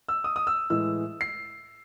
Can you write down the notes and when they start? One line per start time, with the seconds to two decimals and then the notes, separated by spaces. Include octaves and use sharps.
0.09 E6
0.24 D#6
0.36 D#6
0.47 E6
0.70 A2 E3 G#3 E6
1.21 C7